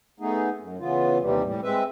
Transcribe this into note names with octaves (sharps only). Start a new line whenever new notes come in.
A3 B3 D#4 G#4
F#2
C#3 E3 B3 F4
D#2 C3 E3 G3
A2 G3
G#3 C4 B4 E5